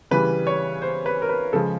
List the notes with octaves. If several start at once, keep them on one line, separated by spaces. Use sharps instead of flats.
C#3 E3 G3 B4
C#5
C5
B4
A#4
B4
C#3 F3 G#3 A4